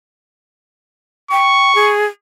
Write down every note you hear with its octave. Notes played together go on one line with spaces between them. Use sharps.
G5 C#6
G#4